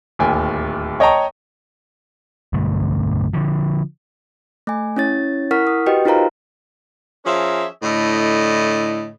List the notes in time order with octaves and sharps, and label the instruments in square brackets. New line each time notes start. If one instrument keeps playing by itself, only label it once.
[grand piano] D1 D#2 G5 G#5
C#5 D#5 G5 A5 A#5 C#6
[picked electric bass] B1 G2 D3 A3
D3 F3
[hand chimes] A3 G#5
C#4 E4 C#5 A6
E4 A#4 F#5 C#6 F6 B6
D#6
F#4 G4 B4 D#5 G5
D#4 F4 A#4 C5 F5 A#5
[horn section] F3 C#4 G#4 A#4 E5
A2 D3 E4 D#5